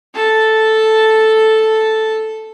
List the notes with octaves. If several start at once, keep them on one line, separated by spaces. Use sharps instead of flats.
A4 A5